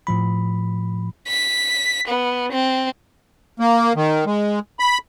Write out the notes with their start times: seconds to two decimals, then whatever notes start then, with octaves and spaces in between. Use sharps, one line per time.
0.07 A2 F3 B5
1.28 B6
2.07 B3
2.52 C4
3.60 A#3
3.96 D#3
4.26 G#3
4.80 B5